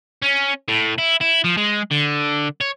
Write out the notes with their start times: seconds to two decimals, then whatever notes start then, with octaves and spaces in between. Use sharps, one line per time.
0.22 C#4
0.68 A2
0.98 E4
1.21 E4
1.44 F3
1.57 G#3
1.91 D3
2.61 C#5